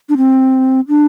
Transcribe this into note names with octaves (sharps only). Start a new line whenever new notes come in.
D4
C4
D4